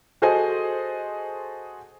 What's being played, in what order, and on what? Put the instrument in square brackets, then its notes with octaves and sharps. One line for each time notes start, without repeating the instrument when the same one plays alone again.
[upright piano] F#4 G#4 A4 C5 D#5 G#5